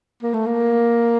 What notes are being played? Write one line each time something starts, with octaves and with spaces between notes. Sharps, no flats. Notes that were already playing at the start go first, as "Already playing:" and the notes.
A#3
A3
A#3